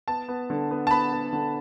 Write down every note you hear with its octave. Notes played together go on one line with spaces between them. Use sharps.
B3 A5
B3
D3
B3
A5
B3 B5
B3
D3